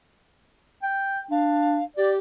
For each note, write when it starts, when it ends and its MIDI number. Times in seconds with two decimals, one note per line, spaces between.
0.82 1.21 79
1.31 1.81 62
1.31 1.83 77
1.97 2.18 67
1.97 2.12 74